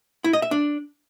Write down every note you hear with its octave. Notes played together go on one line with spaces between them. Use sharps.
E4
D#5
E5
D4